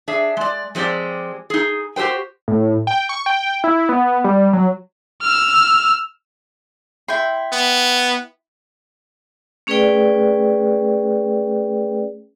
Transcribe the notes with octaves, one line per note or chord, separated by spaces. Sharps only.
D4 G#4 E5
G#3 D5
F3 G#3 C4 G4 D5
D#4 G#4
F#4 G4 A4 C5 G5
A2
G5
C#6
G5
E4
B3
G3
F#3
E6 F6
E4 G5 C6
B3
A3 C#4 G#4 B4 D5 G5